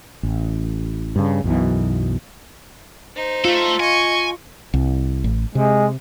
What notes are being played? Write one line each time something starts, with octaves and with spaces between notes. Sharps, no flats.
A1
G2 C#3
B1 F#2 B2 E3
D#4 C5
A3 F4 A4
D#5 G#5 C#6
C2
A1
C3 G#3